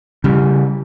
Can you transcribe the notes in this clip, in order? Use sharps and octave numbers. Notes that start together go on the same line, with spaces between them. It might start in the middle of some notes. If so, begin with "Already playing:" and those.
C#3 G3